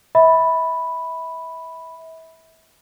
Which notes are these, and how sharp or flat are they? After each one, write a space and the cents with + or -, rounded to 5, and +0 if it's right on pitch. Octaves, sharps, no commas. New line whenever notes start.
E5 -30 B5 +0